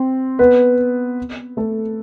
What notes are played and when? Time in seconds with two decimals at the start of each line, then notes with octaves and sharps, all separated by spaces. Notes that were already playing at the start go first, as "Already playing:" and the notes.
Already playing: C4
0.39 B3 B4
1.57 A3 A4